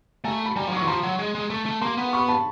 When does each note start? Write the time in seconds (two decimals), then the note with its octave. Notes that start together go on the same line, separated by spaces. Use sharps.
0.24 A3 G#5 A#5
0.46 B5
0.56 G3 G#5 A#5
0.68 F3
0.72 F#3
0.77 E3 C#6
0.87 F3 A#5 C6
1.03 F#3
1.19 G#3
1.35 G#3
1.50 A3
1.66 A3
1.81 A#3 A#5 C6
1.97 B3
2.13 B5 C#6
2.28 A5 B5